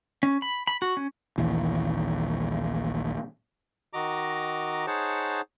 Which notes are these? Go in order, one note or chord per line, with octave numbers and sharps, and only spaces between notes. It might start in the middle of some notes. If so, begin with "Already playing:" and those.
C#4
B5
B5
F#4
C#4
A#1 D#2 E3
D#3 F#4 D#5 A#5 D6
D#4 G#4 C5 C#5 F#5 A5